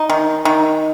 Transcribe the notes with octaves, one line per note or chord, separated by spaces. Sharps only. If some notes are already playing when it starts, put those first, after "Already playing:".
Already playing: D#4
D#3
D#3